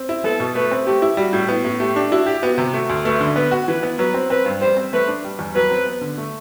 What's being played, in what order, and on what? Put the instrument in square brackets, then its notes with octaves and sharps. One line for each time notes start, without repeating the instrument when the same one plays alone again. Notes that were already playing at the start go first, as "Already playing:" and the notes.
Already playing: [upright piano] C4
E4
[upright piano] B3 [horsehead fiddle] A4
[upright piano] B2
[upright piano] A3 [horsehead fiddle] B4
[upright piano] C4
[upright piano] A3 [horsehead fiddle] G4
[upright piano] E4
[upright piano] G3 [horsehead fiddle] F#4
[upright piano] A2
[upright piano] B3 [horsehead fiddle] E4
[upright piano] A2
[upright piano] A3 [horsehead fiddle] G4
[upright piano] D4
[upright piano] E4 [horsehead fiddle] F#4
[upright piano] G4
[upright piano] B3 [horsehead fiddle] F#4
[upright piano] C3
[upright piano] A3 [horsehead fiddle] F#4
[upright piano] D2
[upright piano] A3 [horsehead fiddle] B4
[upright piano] D3
[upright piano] B3 [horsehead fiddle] B4
[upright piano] F#4
[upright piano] E3 [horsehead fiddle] B4
[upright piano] B3
[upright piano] F#3 [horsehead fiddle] B4
[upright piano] C4
[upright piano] C4 [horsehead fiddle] B4
[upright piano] G2
[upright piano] G3 [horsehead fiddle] C5
[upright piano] C4
[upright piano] A3 [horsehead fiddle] B4
[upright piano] D4
G3
E2
[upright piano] F#3 [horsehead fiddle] B4
[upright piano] C4
B3
D3
A3